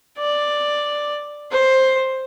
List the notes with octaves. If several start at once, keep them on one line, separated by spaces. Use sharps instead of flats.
D5
C5